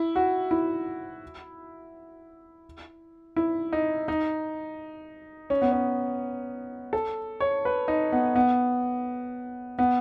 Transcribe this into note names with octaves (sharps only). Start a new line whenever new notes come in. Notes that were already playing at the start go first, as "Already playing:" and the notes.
Already playing: E4
F#4
E4
E4
D#4
D#4
C#4
B3
C#4
A4
C#5
B4
D#4
B3
B3
B3